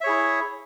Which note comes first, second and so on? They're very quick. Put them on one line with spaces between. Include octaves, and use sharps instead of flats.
E5 C#5 G#4 E4